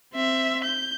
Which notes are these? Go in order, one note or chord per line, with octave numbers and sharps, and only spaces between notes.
C4 E5
G6